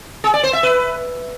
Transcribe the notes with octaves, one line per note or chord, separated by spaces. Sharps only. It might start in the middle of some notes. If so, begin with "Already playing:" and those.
G#4
D5
C5
E5
B4